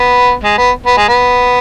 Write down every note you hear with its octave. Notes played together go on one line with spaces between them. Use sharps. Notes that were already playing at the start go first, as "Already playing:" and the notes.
Already playing: B3
G#3
B3
B3
G#3
B3